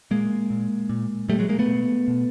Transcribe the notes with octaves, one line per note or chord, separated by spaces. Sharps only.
A#2 G#3 A#3
A#2
A#2
A#2 G3 A3
F#3 G#3
G#3 A#3
A3 B3
B2
B2